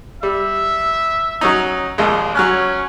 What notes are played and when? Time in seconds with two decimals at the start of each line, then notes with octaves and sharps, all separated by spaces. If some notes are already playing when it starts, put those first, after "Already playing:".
0.23 G3 E5
1.41 F#3 C#4 D#4
1.98 A#1 D#2 G#3
2.35 F#3 C#4 F6 F#6